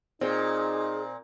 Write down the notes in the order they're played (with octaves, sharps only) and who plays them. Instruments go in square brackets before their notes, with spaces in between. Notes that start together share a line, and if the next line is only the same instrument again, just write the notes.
[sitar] A#2 [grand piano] C4 [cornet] D#4 [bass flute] G#4